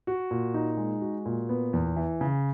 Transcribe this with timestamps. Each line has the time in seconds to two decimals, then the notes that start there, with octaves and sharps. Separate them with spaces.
0.07 F#4
0.31 A#2
0.54 D#4
0.77 G#3
1.01 F#4
1.25 A#2
1.49 B3
1.73 E2
1.96 E3
2.21 C#3